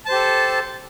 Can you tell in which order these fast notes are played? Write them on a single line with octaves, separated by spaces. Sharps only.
A5 C5 G4 A4